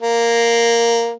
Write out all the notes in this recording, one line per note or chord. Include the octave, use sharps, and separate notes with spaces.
A#3